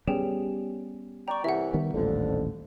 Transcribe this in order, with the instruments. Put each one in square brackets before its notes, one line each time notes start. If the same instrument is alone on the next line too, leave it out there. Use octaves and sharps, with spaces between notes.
[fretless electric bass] G3 B3 C#4 [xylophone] G4 G#4 G5
[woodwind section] D5 G5 [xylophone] A#5 C#6
[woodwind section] C2 E3 [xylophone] E5 F#5
[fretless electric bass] D#3 G3 B3
[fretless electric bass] D#1 A1 [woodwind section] F2 D3